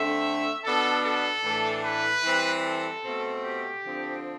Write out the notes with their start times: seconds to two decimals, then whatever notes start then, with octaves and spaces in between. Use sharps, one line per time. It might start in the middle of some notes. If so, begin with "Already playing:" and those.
Already playing: D3 A3 C4 E5
0.64 B2 B3 D4 A4
1.04 A4
1.44 A2 E3 A3 D4
1.83 B4
2.23 E3 G3 C4
2.64 A4
3.03 B2 A3 C4
3.43 G4
3.84 D3 F3 C4